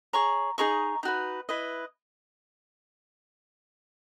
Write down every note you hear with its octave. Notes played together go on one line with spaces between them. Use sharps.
G#4 C#5 A#5 C#6
D#4 G#4 D#5 A#5 C#6
D#4 F#4 B4
E4 B4 D#5